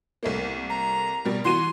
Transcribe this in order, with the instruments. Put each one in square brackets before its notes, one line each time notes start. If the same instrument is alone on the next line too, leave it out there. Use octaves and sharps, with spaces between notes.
[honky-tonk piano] C2 A3 A#3
[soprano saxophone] A#5
[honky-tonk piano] B2 G3 A#4
[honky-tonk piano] E3 F#4 D#7 [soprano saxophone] C6